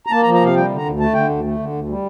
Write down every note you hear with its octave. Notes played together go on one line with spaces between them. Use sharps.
A#5
A#3 A5
A#5
F3
A#5
C3 F5
G3 G5
D3
A#5
D2
A3 A5
D3 G5
D2
A3
D3
D2
G3